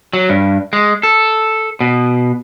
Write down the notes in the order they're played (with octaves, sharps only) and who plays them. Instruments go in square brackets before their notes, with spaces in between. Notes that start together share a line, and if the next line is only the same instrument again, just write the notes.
[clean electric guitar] F#3
G2
G#3
A4
B2